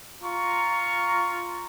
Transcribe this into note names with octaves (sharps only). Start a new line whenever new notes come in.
F4 A#5 C#6